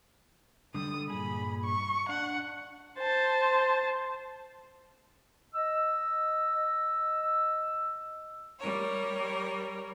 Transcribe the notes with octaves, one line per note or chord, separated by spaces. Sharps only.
D3 G3 A4 D#6
G2 A#2 G#4 B5
C#6
D4 F#5
C5 A5
D#5 E6
G3 A#4 C#5